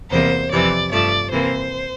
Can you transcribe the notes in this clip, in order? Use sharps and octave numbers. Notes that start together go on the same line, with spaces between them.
E2 C3 E3 G3 A#3 C5
F2 C3 E3 D5
G2 F3 A3 D5
C3 E3 A#3 C5